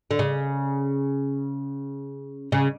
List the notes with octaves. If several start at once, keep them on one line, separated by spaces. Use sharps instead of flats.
D3
C#3
C#3